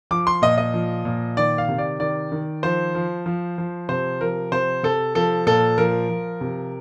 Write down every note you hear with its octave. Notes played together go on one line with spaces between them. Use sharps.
F3 D6
C6
A#2 D#5
D#5
F3
A#2
D#3 D5
F5
C3
D5
D#3 D5
D#3
F3 C5
F3
F3
F3
C3 C5
F3 A#4
C3 C5
C3 A4
F3 A4
A#2 A4
F3 A#4
F3
C3